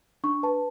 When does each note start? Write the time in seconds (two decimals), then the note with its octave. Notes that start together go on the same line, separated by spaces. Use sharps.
0.24 D4 C#6
0.43 B4 A5